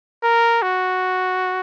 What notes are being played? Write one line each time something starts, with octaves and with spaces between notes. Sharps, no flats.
A#4
F#4